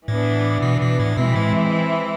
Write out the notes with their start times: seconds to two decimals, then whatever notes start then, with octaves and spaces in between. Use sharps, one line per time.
0.08 A2 E3 B3 D4
0.62 B2
0.82 B2
1.00 A2
1.17 B2 E3 G#3 C4 E4
1.36 A2